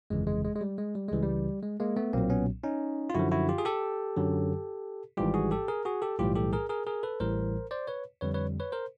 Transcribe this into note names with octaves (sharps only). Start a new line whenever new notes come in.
G1 F2 C#3 E3 G#3
G#3
G#3
G#3
G3
G#3
G3
C#2 C#3 E3 G3 G#3
G3
G#3
G#3 A#3
A3 B3
B1 A#2 F#3 A#3 C4
B3 C#4
C#4 D#4
F4
F#2 D3 F3 E4 F#4
E4 F#4
F4 G4
G#4
G4 A4
F#2 D3 F#3
G#1 G#2 E3 G3 F4 G4
F#4 G#4
G4 A4
G#4 A#4
F#4 G#4
G4 A4
B1 A2 E3 G3 F4 G4
G4 A4
G#4 A#4
G#4 A#4
G#4 A#4
A4 B4
A1 A2 E3 G3 A#4 C5
C5 D5
B4 C#5
F2 D3 G3 B4 C#5
B4 C#5
B4 C#5
A#4 C5